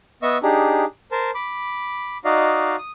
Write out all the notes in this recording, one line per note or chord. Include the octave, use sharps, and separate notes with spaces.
B3 D#5 E5 C#6 E6
D4 D#4 G4 G#4
A#4 C5 A5
B5 D6
D#4 F#4 D5 D#5 F5
D#6